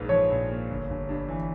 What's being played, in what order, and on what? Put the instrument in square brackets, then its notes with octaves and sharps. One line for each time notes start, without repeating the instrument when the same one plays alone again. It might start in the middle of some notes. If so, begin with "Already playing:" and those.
Already playing: [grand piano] A#1 G#2 A#3 [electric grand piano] B4
[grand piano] F3 [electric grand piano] C#5
[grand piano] A#1
A#3
G1
G1
G2
E3